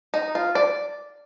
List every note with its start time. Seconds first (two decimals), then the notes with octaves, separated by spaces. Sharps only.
0.14 D#4
0.35 F4
0.55 D5